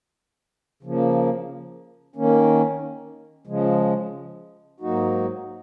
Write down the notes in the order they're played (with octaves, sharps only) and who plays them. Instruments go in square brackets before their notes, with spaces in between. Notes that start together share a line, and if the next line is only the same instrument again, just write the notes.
[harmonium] C#3 F3 A#3
D#3 A#3 C#4
C#3 F3 G#3
G#2 F#3 A#3 D#4 F#4